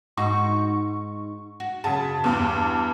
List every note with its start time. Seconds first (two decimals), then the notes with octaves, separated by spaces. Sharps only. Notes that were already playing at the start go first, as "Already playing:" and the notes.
0.17 G#2 D#4 F#4 C#6
1.60 F#4
1.84 F#2 C#3 F#4 G#4 A5
2.24 E2 G2 B3